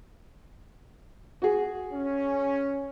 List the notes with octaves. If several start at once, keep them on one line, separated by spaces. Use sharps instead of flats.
F#4 G#4
C#4